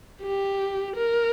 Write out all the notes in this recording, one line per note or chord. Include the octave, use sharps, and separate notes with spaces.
G4
A#4